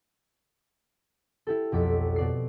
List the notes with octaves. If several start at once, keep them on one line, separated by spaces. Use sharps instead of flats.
E4 G4 A4
B1 F2 D6 B6
B2 D5 C7